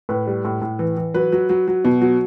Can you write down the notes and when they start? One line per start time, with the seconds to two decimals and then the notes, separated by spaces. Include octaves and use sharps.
0.09 A2 B4
0.27 G3
0.45 A2
0.62 A2
0.79 E3
0.97 E3
1.14 F#3 B4
1.32 F#3
1.50 F#3
1.68 F#3
1.84 B2
2.02 F#3